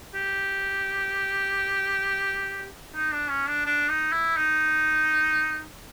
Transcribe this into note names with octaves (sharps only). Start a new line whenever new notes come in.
G4
D#4
D4
C#4
D4
D4
D#4
E4
D#4